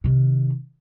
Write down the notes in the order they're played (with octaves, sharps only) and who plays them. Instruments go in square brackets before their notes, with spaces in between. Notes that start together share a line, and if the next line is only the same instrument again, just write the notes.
[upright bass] C3 D#3